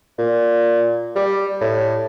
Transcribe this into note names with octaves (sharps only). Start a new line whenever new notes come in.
A#2
G3
A2